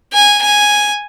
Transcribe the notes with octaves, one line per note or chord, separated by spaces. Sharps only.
G#5
G#5